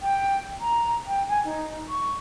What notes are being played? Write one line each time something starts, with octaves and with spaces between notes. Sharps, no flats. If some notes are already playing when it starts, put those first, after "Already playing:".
G5
A#5
G5
G#5
D#4
C#6